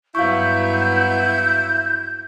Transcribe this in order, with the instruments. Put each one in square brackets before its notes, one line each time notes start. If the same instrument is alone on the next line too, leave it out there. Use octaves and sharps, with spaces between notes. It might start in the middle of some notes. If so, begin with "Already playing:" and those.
[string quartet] G2 F#3 B3 [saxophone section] E4 [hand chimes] F5 C#6 [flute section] G6